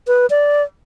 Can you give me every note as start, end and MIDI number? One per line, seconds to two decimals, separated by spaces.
0.07 0.26 71
0.30 0.63 74